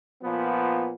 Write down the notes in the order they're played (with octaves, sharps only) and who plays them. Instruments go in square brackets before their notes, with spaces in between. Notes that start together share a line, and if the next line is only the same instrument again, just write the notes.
[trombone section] A#2 F3 B3